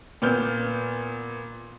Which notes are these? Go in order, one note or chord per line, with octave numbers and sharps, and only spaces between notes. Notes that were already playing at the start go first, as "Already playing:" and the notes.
A#2 B3 F6 G6